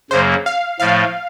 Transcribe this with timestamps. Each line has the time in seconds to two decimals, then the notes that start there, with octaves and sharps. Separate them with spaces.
0.11 F#2 C#3 F#3 A#3 C5
0.46 F5
0.80 A2 F3 A3 F5